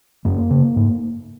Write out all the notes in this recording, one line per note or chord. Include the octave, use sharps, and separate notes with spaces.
F#2 A#3
C#3
G#2